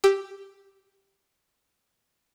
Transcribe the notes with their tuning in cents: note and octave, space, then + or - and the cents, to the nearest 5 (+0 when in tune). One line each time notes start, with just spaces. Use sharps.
G4 +0 E6 +0